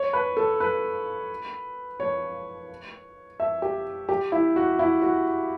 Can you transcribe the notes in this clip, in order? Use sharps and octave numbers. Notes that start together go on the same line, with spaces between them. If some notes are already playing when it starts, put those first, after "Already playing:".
Already playing: C#5
B4
A4
B4
C#5
E5
G4
G4
E4
F#4
E4
F#4